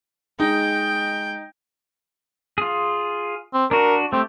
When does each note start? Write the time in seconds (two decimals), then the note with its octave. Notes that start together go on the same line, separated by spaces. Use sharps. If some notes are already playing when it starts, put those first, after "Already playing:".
0.40 G#3 D#4 G5
2.58 F4 G#4
3.54 C4
3.71 D4 F#4 A#4
4.12 A3 C4 G4